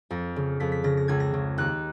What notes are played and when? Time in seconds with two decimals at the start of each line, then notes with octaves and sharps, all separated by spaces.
0.10 F2 A#6
0.36 C#3
0.60 F2 B6
0.72 B6
0.84 C#3 A#6
0.97 A#6
1.08 C#2 G#6
1.20 A#6
1.34 C#3
1.58 D#2 F#6